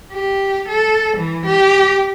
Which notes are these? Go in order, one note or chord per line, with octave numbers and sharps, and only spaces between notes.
G4
A4
E3
G4